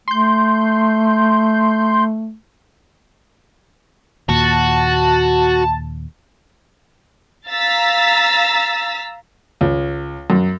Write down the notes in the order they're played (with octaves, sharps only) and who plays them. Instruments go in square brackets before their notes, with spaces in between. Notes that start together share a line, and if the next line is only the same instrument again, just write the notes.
[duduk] A3 [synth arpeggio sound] C6 G6
[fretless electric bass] D#2 A#2 [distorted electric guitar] F#4 [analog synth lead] A5
[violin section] F5 A#5 E6 A6 B6
[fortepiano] C#2
F#2